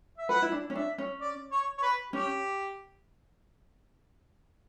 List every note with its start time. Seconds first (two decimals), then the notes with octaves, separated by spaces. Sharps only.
0.18 E5
0.29 B4 F#5
0.42 E4
0.52 D4
0.70 C#4
0.75 D4 E5
0.98 C#4
1.21 D5
1.52 C#5
1.78 C#5
1.82 B4
2.13 C#4 G4